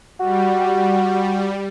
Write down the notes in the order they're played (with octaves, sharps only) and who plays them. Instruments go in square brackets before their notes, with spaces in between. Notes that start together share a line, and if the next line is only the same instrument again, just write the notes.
[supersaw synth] G3 [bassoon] F#4